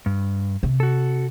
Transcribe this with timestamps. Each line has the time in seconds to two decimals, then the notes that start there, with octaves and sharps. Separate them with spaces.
0.06 G2
0.63 C3
0.80 F#4 A4